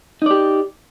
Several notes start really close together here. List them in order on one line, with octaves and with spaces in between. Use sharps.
D#4 D5 G4